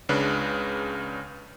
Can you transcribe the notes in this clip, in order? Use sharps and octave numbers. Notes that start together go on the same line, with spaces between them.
C#2 C#3 D4 B4